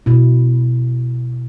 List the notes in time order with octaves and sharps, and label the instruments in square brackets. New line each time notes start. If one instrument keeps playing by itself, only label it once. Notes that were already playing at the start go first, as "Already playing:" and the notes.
[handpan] B2 E4